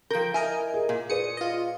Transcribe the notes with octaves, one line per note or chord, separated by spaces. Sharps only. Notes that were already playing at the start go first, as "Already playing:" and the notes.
F3 A#4 G5 G6
E4 A#4 D#5 G#5
G#4
A#2
G#4 B4 D5 D#6 C#7
F4 D#5